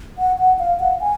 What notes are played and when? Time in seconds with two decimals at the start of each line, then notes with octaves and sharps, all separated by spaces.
0.18 F#5
0.39 F#5
0.59 F5
0.79 F#5
1.01 G#5